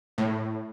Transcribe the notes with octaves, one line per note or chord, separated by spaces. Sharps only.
A2